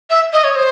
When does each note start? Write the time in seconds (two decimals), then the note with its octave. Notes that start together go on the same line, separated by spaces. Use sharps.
0.10 E5
0.33 D#5
0.44 C#5
0.56 C5